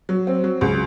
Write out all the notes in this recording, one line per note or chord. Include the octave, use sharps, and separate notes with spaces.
F#3
C4
F#3
C#2